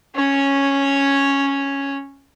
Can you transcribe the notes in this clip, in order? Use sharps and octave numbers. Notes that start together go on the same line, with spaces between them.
C#4 C#5